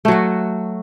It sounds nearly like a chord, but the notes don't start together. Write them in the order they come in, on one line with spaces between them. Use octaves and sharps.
A3 F#3 F#4